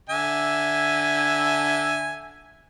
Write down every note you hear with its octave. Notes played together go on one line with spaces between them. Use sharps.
D3 E5 G#5